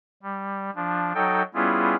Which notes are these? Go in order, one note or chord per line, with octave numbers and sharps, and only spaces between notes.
G3
F3 D4
F#3 D#4 A4 G5
G3 B3 C#4 E4 F4 G#4